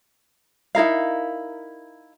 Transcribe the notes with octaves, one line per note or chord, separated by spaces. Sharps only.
D#4 E4 A#4 F5